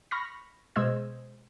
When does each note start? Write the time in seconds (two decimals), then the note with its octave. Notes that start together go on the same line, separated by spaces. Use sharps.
0.11 B5 C#6 F6 A#6
0.76 B2 G#3 C5 D#5 E6 G#6